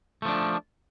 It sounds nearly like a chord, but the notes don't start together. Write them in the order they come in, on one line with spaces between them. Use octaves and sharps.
A3 F3 D4